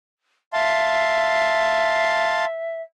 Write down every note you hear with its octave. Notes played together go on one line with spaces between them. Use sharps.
E5 F5 A5 C6